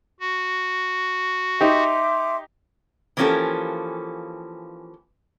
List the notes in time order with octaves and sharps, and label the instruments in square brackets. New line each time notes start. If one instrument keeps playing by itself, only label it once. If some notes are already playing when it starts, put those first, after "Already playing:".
[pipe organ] F#4
[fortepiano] D#4 G4 [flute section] E5 C6 D6
[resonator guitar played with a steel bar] E3 F3 A#3 C#4 G4 A4